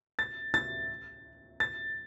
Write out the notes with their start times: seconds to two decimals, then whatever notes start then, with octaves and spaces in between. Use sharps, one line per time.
0.19 A6
0.54 A6
1.60 A6